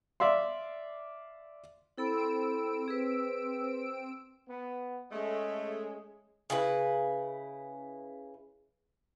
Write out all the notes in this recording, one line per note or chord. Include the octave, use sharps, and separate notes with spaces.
D5 E5 F5 C6
C4 E4 A4 B5 E6 D7
G#4 B4
B3
G#3 A3 C#4 G#4
C#3 E4 F#4 B4